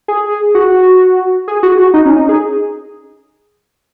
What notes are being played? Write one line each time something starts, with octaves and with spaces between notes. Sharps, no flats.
G#4
F#4
G#4
F#4
F#4
D#4
C#4
D#4
G#4